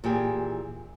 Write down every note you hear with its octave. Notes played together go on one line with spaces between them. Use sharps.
A#2 E3 G4 G#4